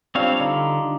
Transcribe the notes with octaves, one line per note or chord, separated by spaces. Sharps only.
G3 C4 D4 F4 C#5 F5
D3 D4 D#4